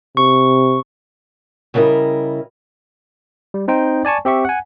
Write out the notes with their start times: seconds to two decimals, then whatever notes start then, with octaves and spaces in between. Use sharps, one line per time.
0.17 C3 C#6
1.74 C#3 G3 E4 A#4 D#5
3.54 G3
3.68 C4 D#4 C5 G5
4.05 D5 G#5 A5 C#6
4.25 C4 G4 E5 C#6
4.45 F#5 G#5